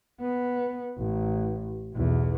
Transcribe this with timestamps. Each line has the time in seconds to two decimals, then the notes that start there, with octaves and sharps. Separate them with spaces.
0.20 B3
0.98 A1
1.94 B1 E2